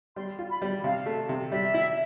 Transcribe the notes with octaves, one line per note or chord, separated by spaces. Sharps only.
G3 C6
F4
B5
G3
C3 F5
A3
C3
G3 E5
E4